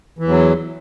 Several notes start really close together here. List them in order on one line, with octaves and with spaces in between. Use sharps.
E3 E2 F#3